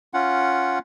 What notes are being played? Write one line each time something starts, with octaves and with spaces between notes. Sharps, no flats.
C#4 F4 F#5